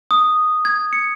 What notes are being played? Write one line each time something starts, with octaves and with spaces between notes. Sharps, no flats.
D#6
G#6
C#7